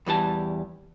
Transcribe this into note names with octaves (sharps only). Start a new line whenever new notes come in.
E2 E3 G3 A5